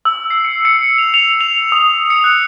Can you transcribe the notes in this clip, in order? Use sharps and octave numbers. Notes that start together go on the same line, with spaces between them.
E6
C7
C#7
C#7
F7
F7
F7
D#6
C#7
F#6